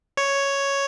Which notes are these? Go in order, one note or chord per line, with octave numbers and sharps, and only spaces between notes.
C#5